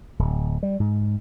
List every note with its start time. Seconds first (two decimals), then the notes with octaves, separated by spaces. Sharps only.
0.19 D1
0.63 G3
0.80 G#2